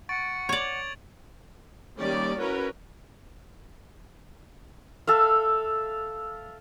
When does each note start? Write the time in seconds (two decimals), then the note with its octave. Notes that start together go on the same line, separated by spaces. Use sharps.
0.09 F#5 C#6 A6 D7
0.49 C#5 D5 G#6 F7 F#7
1.99 D#3 G3 A#3 C#4 G4 D5
2.38 C#4 E4 F#4 A#4 B4 C#5
5.07 A4 E5 F5